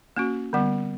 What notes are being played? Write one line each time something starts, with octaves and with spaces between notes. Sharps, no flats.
A#3 C#4 F#4
D3 G3 B3